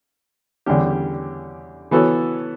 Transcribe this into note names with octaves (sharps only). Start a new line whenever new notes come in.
E2 D3 G3 C#4 G4
E3 B3 F#4 A4 C#5